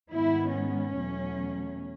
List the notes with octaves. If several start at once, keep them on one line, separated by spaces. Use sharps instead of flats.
G#2 D#3 G#3 B3 E4
C#4
E2 B2 F#3 A3